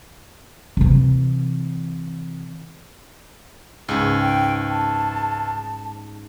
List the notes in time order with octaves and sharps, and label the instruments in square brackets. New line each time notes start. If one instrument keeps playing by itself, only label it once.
[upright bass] C3 E3
[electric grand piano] C#2 [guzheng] G#2 C#4 [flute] G#4
[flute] G5
A5